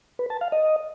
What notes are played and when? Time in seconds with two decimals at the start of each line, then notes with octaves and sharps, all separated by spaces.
0.19 B4
0.30 A5
0.41 F5
0.52 D#5